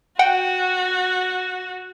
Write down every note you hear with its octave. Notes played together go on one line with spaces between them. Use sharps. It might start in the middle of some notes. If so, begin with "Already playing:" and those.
F#4 F#5 G5